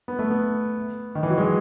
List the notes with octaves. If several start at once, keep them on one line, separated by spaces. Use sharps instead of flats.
B3
A3
B3
D#3
E3
F#3
G#3